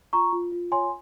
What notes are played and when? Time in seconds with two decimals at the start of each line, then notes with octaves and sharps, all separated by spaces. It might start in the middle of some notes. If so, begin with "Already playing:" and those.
0.13 F4 A#5 C#6
0.32 F4
0.52 F4
0.72 C#5 G#5 C6